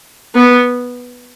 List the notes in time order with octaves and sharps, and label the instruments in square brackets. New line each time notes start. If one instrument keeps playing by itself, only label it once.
[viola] B3